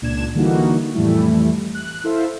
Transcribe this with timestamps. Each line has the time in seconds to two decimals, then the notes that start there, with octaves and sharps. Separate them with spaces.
0.01 C#2 A#2 D4 G#6 E7
0.35 D3 E3 G3 A#3 D#4 F#4
0.94 F2 A2 E3 G3 A3 E4
1.75 F#6
2.04 E4 A4 C5 E5 F5